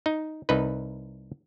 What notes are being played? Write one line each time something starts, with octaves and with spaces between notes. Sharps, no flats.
D#4
C2 D#4 B4